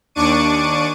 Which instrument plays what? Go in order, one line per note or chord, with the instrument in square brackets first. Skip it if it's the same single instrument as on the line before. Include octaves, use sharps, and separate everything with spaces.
[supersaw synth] D#2 D4 C#6 D6 C#7 D#7